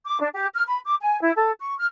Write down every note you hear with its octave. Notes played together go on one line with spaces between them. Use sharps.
D6
D4
G4
F6
B5
D6
G#5
E4
A4
C#6
F6